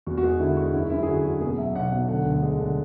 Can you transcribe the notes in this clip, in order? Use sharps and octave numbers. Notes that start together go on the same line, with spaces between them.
E2 F#4
F#4
G#3 G#4
D3 E4
G#3 F#4
F#2 E4
F#2 E4
G#4
D3 F#4
F#2 F#4
B2 G#4
F#3 E5
B1 F#5
B1
D3 F#5
D2
G#3
D3